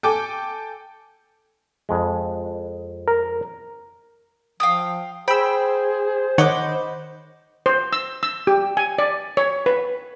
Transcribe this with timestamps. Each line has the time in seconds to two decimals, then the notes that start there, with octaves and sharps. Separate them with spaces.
0.03 A4 G5 G#5 D6
1.89 F2 G#3
3.08 A#4
4.60 F3 F5 G5 D#6
5.28 G#4 C5 G5 B5 E6
6.38 D#3 C#5 D#5 F#5 B5 D6
7.66 C5
7.93 E6
8.23 E6
8.47 G4
8.77 G#5
8.98 D5
9.37 C#5
9.66 B4